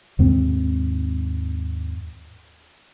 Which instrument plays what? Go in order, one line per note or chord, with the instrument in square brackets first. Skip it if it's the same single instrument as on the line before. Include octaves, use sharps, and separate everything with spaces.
[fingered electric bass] D#2 G#2 C4